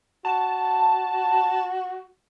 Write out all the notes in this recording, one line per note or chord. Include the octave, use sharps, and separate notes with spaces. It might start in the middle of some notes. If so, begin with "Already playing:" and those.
F#4 A5